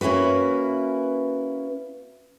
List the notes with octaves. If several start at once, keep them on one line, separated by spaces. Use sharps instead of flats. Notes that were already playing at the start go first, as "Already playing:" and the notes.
A#3 C#4 E4 F#4 B4